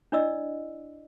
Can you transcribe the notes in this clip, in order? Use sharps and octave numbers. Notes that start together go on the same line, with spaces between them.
D4 E4 D5 D#5 E6